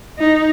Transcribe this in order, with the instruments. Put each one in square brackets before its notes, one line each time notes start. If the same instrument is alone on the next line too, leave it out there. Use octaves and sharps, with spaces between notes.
[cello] D#4